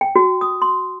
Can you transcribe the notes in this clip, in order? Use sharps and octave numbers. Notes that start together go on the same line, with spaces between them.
G5
F#4
D#6
C6